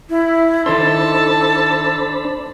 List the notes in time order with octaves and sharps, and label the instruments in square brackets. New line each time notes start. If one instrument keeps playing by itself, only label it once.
[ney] E4
[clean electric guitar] D#3 E4 C6 [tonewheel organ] D4 C5 B5 [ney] A4 [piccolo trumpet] A5